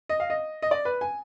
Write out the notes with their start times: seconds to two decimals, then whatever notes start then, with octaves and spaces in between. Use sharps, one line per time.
0.09 D#5
0.20 F5
0.30 D#5
0.62 D#5
0.71 D5
0.85 B4
1.01 G#5